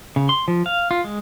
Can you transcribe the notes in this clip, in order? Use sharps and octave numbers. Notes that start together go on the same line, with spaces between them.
C#3
C6
F3
F5
F4
G#3